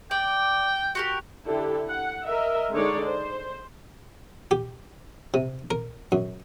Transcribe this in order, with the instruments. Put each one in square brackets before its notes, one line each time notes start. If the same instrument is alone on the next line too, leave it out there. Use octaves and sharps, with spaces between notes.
[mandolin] D5 [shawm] G5
[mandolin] F#4 G4 A#4
[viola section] D3 E4 G4 A4
F#5
A#4 D#5 E5
D3 G#3 D#4 C#5 D5
C5
[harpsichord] G4
C3
A#4
F#2